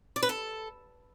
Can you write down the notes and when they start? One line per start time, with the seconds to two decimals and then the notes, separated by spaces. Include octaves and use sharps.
0.16 D5
0.23 B4
0.29 A4